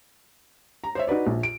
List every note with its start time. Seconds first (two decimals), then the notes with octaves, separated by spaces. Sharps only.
0.84 A#5
0.95 C5 C#5 E5
1.07 D#4 F#4 B4 D5
1.27 A#1
1.43 D7